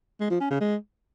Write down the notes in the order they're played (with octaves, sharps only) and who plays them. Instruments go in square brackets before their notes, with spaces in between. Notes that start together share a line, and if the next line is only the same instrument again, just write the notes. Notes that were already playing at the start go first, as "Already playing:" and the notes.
[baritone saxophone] G#3
F3
C#4
C#3
G#3